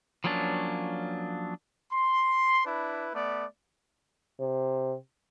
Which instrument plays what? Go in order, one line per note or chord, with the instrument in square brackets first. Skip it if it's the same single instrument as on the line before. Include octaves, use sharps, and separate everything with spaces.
[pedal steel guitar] F3 F#3 A#3 C#4 D4
[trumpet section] C6
D4 E4 B4
A3 B3 D5
[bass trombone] C3